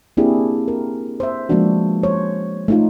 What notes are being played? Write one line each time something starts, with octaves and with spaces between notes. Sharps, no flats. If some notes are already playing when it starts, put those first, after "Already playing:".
A#3 C4 D4 E4 G4 G#4
A#4
C5 E5
F3 G#3 A#3 B3 D4 F#4
C5 C#5
A3 D#4 F4